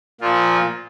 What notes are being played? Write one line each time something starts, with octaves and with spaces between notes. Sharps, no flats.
A#2 F3 F4